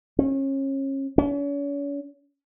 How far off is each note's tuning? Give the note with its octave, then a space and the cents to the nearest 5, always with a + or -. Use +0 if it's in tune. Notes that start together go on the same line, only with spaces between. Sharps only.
C#4 -30
C#4 +40